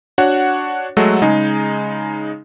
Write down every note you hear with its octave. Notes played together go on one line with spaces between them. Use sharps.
D4 F#4 C#5 F#5
F#3 G#3 A3 A4 F#5
C#3 G#3 D#4 G#5